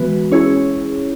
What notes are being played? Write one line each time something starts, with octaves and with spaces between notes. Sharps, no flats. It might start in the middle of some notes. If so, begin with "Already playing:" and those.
Already playing: E3 G#3 B3 F#4 B4
C#4 E4 G#4 C#5